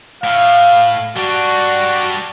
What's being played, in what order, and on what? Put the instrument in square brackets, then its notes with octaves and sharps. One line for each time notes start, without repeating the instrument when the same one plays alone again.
[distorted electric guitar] A2 [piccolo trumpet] F5
[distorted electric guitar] G3 D4 [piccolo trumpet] F#4